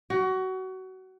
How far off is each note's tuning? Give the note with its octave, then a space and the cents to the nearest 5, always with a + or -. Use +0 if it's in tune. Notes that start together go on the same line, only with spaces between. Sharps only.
F#4 +25